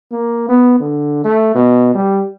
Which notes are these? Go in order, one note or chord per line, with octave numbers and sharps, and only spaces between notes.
A#3
B3
D3
A3
B2
G3